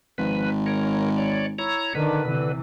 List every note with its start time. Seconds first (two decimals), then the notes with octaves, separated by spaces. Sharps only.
0.18 G#1 F3 B4
0.66 A#4 C#5
1.16 C#5 D5
1.58 E4 C#5 A#5
1.95 D3 D#3 D4 B4
2.28 C3 E3